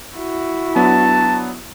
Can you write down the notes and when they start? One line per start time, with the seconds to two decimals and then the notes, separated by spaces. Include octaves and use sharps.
0.16 E4 F#4
0.76 F#3 B3 D4 A5